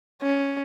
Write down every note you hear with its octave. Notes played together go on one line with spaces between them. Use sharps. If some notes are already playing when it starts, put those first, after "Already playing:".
C#4